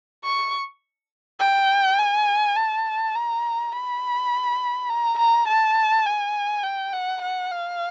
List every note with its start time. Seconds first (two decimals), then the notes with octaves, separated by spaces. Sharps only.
0.24 C#6
1.39 G5
1.99 G#5
2.56 A5
3.15 A#5
3.73 B5
4.89 A#5
5.18 A#5
5.48 A5
6.06 G#5
6.63 G5
6.93 F#5
7.22 F#5
7.51 F5